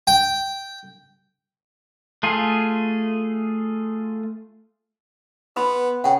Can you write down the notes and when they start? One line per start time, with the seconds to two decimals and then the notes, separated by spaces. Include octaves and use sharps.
0.07 G5
2.23 A3 F4 G#4
5.56 B3 B4 B5 C6
6.04 C#3 F#5 G5